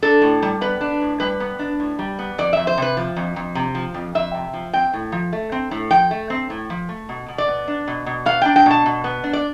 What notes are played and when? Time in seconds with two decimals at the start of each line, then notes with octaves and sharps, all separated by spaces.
0.03 D4 A4
0.22 A2
0.42 G3
0.61 B3 B4
0.81 D4
1.01 A2
1.20 G3 B4
1.40 B3
1.59 D4
1.80 A2
1.99 G3
2.19 B3
2.38 F2 D5
2.53 F2 E5
2.67 C5
2.78 C3 B4
2.97 F3
3.16 F2
3.36 F2
3.55 C3
3.75 F3
3.94 F2
4.15 F2 E5
4.34 C3
4.53 F3
4.73 C4 G5
4.93 A2
5.12 F3
5.33 A3
5.52 C4
5.71 A2
5.91 F3 G5
6.11 A3
6.30 C4
6.50 A2
6.70 F3
6.89 A3
7.09 B2
7.28 B2
7.38 D5
7.48 B3
7.68 D4
7.87 B2
8.06 B2
8.26 B3 F5
8.42 D4 G5
8.56 G5
8.66 B2 A5
8.86 B2
9.04 B3
9.24 D4
9.33 D5